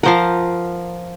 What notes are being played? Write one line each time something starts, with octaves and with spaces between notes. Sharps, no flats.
F3 A#4 C5 F5 F#5